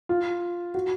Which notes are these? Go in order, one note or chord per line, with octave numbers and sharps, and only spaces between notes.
F4
F#4